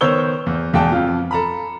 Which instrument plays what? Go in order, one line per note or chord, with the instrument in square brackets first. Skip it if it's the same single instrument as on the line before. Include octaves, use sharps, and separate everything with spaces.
[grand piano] D#3 B3 C5 C#5 E6 G7
E2
E1 E2 G#3 G5 A5
F2 F4
A4 A#5 B5